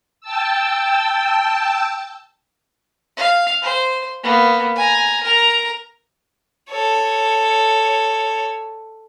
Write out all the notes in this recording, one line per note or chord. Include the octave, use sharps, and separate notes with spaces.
G5 A5 E6
F5
C5
A#3 B3
G#5 A#5
A#4 A#5
A4 C#5